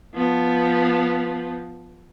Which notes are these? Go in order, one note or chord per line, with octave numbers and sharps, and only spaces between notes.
F3 B3